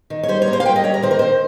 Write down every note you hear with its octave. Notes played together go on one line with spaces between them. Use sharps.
D#3
C#5
G3 C5
C#5
A#3
C5
F5
G3 G5
D#5
G3 C#5
A#4
D#3 C5
A#4
D#3 C5